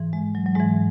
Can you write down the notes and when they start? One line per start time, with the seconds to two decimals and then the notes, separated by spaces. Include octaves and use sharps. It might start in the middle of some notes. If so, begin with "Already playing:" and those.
Already playing: G#2 E3
0.13 G#3
0.35 F#3
0.46 F#3
0.55 G#2 E3 G#3